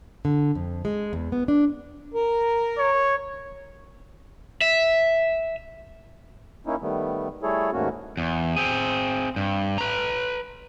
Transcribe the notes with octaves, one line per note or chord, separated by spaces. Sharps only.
D3
F2
G#3
E2
B3
D4
A#4
C#5
E5
A#3 C#4 D#4 E4
D#3 G3 A3 B3
G3 A3 E4 G#4 A4 C#5
D#2 G#2 A3 A#3 C#4 F#4
E2
C4 G#4
G2
B4 A#5